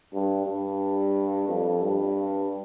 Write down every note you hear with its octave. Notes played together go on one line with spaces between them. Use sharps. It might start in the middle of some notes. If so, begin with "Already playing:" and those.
G2
G2
F2
G2